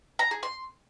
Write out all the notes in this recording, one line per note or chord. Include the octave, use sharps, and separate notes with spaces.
A#5
G#4
C6